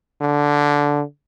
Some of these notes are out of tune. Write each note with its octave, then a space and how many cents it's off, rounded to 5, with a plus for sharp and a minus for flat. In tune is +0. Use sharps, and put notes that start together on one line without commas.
D3 -10